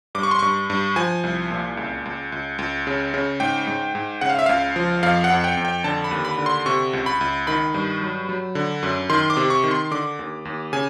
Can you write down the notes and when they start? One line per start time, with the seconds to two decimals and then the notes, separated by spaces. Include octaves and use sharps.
0.15 G2 D6
0.23 C#6
0.31 C6
0.39 G2 C#6
0.70 G2
0.96 F3 G#5
1.24 C2
1.50 A#2
1.77 C#2
2.05 C#2
2.32 C#2
2.59 C#2
2.87 C#3
3.14 C#3
3.40 G#2 G5
3.67 G#2
3.95 G#2
4.21 C#3 F#5
4.30 F5
4.39 E5
4.46 C#2 F5
4.76 F3
5.03 F2 F5
5.24 F#5
5.30 F2
5.44 G5
5.57 F2
5.65 G5
5.84 D3 A5
6.04 B5
6.11 D#2
6.25 B5
6.38 D3
6.46 C6
6.66 C3 C#6
6.93 C#2
7.06 B5
7.21 C#2
7.47 D#3 B5
7.74 G2
8.01 F#3
8.29 F#3
8.55 D3
8.83 F#2
9.10 D#3 C6
9.30 D6
9.37 C3
9.50 C#6
9.64 D#3
9.71 C6
9.91 D3 D6
10.19 D#2
10.45 D#2
10.73 C#3 G#5